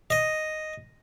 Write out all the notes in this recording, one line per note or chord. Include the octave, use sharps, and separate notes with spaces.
D#5